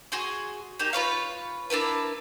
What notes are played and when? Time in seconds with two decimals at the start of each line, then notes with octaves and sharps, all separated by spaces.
0.12 F#4 G#4 C6
0.79 A#3 D#4 G4
0.93 F4 B4 C#5 F5
1.70 D4 E4 A#4 B4